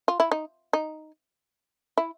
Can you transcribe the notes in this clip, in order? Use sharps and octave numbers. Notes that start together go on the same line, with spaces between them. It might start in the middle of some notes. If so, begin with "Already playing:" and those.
F4
E4
D#4
D#4
E4